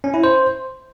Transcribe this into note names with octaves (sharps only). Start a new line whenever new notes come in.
C#4
E4
C5